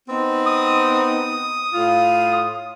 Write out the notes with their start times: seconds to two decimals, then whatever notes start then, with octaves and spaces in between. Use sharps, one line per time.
0.08 B3 C4 D#4
0.46 D#6
1.73 A2 F4